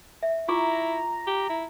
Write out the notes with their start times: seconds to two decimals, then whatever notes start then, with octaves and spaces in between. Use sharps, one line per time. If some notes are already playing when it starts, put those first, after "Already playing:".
0.23 E5
0.48 E4 F4 A#5 C#6 D6
1.27 G4
1.50 E4